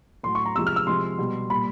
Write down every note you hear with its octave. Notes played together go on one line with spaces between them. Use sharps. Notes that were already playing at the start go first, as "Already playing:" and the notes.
A2 F#3 C6
C#6
A#5
C3 F3 G#3 E6
F6
E6
C3 F3 G#3 C6
B2 G3
A#2 G3 B5